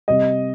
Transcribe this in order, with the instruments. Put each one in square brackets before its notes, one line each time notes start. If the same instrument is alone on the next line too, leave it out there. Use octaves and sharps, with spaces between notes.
[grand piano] C3 G3 C4 [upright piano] D#5